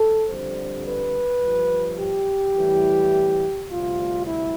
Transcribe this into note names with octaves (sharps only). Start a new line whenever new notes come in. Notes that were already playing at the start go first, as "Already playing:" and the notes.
Already playing: A4
F2 D3 G3 C5
B4
G2 F3
G4
A2 E3 G3
D2 C3 G3 F4
E4